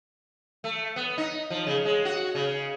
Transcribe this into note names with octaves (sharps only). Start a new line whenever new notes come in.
A3
B3
D#4
F3
C#3
G#3
F#4
C#3